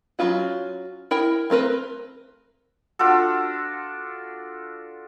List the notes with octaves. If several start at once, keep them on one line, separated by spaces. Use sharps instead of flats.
F#3 A3 C#4 F4 F#4
E4 A#4 G5
A3 C4 A#4 B4
D4 F4 F#4 A4